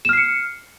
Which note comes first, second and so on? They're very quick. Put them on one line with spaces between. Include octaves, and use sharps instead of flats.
E7 F6 C7 C#7